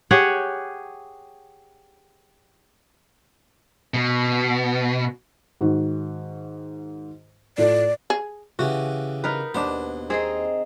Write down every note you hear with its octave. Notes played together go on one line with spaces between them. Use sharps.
G4 G#4 C#5 F#5
B2
G#2 D#3 F#4
A2 F4 A4 D5
G#4
C#3 E3 F#4 G4
D#4 A#4 B4
D#2 B2 B3 D4 C5
D#3 C4 G#4 D#5 A#5